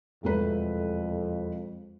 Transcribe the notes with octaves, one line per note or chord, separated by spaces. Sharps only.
E1 F2 A3 B4